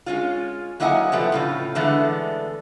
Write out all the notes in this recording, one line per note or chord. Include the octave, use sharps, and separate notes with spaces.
G#3 C#4 F4
F#3 A#3 E4 D#5 F#5 G#5
C3 F3 G3 A3 B3
A2 C#3 F4
D3 E3 G#3 A3 B3